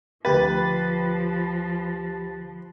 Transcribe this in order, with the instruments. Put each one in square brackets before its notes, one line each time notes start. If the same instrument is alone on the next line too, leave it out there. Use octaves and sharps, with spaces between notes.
[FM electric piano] D2 G4 A6 [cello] F3 [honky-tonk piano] B4